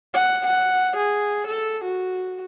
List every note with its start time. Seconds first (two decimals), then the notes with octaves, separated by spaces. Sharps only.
0.14 F#5
0.47 F#5
0.97 G#4
1.48 A4
1.85 F#4